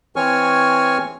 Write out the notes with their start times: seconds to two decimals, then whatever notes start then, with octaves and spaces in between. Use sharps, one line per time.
0.16 E3 C4 C#5 G#5 C#6 F6